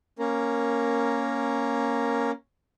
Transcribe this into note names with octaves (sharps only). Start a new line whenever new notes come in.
A#3 C#4 A#4